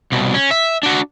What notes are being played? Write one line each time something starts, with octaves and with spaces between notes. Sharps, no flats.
C2 B2
C#4
E5
D4 F#4